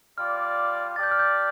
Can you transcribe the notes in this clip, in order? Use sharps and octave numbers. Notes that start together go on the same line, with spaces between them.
G3 F4 D5 F6
D4 G4 D5 A6
G6
F6
G6